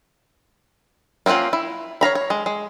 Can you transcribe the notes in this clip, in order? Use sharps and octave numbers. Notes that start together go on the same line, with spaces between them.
A#3 C4 C#4 F4 F#5
E4
C#5 F5 A#5 B5
C#5
G#3
G#3